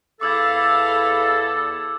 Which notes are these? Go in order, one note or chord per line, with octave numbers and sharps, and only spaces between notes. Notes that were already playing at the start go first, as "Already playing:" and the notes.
E2 A4 F5 B5 D6 E6 G#6